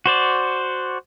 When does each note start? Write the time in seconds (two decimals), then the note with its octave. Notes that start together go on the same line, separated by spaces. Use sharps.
0.06 F#4 C5 D5